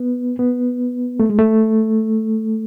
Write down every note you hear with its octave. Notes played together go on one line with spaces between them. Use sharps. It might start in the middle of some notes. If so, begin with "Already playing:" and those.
Already playing: B3
B3
A3
G#3
A3